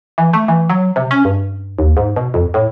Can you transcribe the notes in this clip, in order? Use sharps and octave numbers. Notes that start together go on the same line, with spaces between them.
E3
A3
E3
F#3
C3
C#4
G2
D#2
G#2
B2
F2
A2